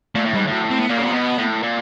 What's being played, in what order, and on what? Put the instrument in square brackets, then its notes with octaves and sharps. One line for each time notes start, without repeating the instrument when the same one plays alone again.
[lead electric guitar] A#2 [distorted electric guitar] A3
[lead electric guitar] A2
[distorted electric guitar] G3
[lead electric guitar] G#2
[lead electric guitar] A2 [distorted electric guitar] F#3
[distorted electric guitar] C4
B3
[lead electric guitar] A#2 [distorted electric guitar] A#3
[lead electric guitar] C#3
[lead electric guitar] C3 [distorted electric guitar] B3
[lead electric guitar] B2
A2
A#2